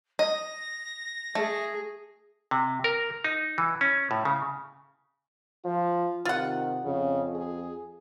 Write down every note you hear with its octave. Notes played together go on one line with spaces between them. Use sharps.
D#5 A#6
A3 G#4
C3
A#4
D#4
E3
C#4
A2
C#3
F3 F4
C3 D#3 F4 F#5
F2 C#3
G#4